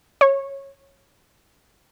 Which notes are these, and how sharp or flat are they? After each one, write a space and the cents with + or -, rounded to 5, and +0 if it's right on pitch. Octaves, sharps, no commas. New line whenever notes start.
C#5 -15